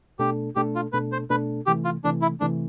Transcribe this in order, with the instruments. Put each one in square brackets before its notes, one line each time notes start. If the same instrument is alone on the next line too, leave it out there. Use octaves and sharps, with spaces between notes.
[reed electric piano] B2 A3 D4 A4 [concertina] G4
[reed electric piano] B2 A3 D4 A4 [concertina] G4
[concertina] F4
[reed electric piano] B2 A3 D4 A4 [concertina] B4
[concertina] C5
[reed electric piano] B2 A3 D4 A4 [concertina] B4
[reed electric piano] C3 E3 A3 [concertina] G4
[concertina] F4
[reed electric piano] C3 E3 A3 [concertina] D4
[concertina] E4
[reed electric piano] C3 E3 A3 [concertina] D4